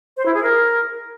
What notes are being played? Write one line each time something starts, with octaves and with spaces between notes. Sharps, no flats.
C5
E4
G#4
A#4